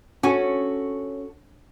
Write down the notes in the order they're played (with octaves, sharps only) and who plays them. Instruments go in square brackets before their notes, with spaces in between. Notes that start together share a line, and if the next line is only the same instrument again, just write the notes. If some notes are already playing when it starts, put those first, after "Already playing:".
[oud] C#4 [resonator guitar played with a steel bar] F#4 A4